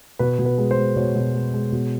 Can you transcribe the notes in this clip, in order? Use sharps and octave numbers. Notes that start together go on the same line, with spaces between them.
B2 B4
B2
B4
G#3
C5
G#3
B2 C#5
B2
G#3
G#3
B2